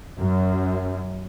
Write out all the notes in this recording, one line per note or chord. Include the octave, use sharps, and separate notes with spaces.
F#2